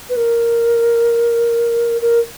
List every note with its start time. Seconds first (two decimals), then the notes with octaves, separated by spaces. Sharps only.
0.09 B4
0.16 A#4
2.01 A#4